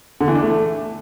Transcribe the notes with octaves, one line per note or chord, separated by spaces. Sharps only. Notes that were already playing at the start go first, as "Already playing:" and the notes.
D3
E3
D4
A3